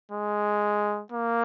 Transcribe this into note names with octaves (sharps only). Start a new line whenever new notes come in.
G#3
A#3